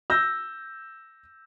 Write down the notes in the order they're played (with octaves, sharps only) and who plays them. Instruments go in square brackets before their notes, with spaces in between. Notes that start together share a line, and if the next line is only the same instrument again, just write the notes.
[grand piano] E6 G6 A#6